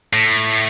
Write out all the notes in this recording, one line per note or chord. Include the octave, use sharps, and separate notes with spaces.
A2